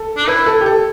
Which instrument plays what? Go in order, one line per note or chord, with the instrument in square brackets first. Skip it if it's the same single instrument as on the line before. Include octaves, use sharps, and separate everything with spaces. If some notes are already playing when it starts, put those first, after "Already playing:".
Already playing: [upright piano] A4
[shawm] D4
[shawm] E4 [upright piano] B4
[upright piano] A4
G4
A4